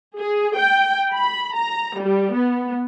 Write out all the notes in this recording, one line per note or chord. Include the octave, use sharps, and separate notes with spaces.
G#4
G5
B5
A#5
G3
B3